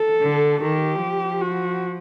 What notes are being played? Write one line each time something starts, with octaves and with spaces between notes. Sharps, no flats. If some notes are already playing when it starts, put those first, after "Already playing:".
Already playing: A4
D3
D#3 G4
F3
F#4